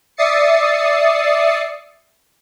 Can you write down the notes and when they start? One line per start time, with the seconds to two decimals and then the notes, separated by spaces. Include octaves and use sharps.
0.17 D5 E5 D#6 A6 C7 C#7